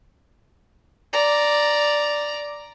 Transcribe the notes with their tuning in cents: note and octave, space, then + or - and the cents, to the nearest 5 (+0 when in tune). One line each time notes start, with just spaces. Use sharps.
D5 +0 A#5 +0